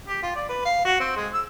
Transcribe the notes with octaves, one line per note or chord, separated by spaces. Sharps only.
G4
F4
D5
B4
F5
F#4
C4
G#3
E6